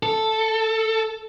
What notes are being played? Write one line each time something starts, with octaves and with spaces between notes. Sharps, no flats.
A4